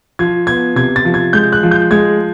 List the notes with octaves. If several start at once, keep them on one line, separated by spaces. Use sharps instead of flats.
F3 G#6
B3 G#6
C3 G#6
A6
F3
G#6
G#3 G6
F#6
F3
G6
G#3 G#6